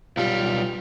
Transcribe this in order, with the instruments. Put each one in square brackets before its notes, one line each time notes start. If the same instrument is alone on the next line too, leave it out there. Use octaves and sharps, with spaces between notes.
[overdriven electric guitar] B1 G3 [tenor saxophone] F4